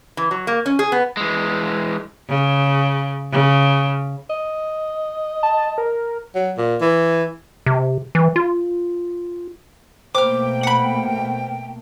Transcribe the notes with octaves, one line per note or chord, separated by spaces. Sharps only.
E3
F#3
A#3
C#4
G#4
B3
E3 G#3
C#3
C#3
D#5
A5
A#4
F#3
A#2
E3
C3
E3
F4
B2 A3 A#3 C5 G5 D6 F6
F#5 B5